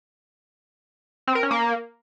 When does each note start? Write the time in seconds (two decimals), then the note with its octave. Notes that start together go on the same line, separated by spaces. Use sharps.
1.27 C4
1.35 A#4
1.43 C#4
1.51 A#3